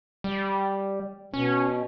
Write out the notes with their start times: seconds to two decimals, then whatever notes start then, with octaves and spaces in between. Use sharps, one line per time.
0.24 G3
1.33 B2 C#4